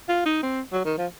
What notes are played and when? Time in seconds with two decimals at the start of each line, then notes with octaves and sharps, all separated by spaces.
0.08 F4
0.26 D#4
0.43 C4
0.72 F#3
0.85 D#3
0.98 F3